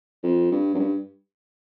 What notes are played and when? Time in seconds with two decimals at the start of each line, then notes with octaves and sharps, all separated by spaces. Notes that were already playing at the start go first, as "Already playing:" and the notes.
0.23 F2
0.51 G2
0.74 F#2
0.79 G2